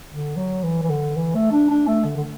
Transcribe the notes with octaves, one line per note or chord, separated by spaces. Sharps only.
D3
F#3
E3
E3
D3
E3
A3
D4
D4
A3
D3
D3